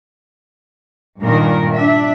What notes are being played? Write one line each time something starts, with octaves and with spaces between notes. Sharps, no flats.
G2 A#2 D#3 A#4
D4 E5